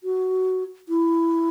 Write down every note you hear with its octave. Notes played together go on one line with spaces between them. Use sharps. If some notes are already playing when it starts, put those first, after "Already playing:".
F#4
E4